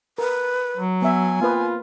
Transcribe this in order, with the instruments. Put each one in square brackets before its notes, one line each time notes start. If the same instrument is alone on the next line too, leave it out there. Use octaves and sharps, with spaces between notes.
[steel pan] A#4 [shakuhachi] B4
[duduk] F#3
[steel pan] B3 E5 [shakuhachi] G#5
[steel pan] A#3 C4 B4 [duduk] F4